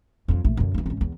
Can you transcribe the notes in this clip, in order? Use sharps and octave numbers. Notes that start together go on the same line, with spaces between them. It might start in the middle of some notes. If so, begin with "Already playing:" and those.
F2 F#3
A#1 A3
F#2 D3
E3 A#3
G#1 C#4
E2